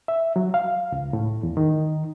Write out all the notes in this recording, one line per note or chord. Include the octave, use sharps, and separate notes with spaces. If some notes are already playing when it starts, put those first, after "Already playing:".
E5
F#3
F5
C#2
A2
E2
D#3